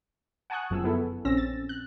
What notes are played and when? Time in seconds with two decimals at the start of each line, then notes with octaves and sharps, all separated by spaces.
0.50 F#5 G#5 A5 C#6 D#6 F#6
0.70 G1 F#2 F3 G#4 G#5 E6
0.84 B3 E4 A4
1.25 A#1 C4 C#4 E6 A#6
1.37 A6
1.69 F#6